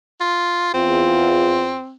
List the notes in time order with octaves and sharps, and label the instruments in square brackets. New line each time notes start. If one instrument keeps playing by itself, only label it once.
[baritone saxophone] F4
[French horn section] E2 F4 [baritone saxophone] C4